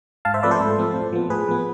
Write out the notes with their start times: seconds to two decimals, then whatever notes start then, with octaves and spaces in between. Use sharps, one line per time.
0.25 G#2 F5 A5
0.34 C5 E5
0.43 F3 A3 C4 B4 D5
0.51 A4 C5
0.60 G#2
0.78 F3 A3 C4
0.95 A2
1.13 F3 B3
1.30 A2 G#4 B4
1.48 F3 B3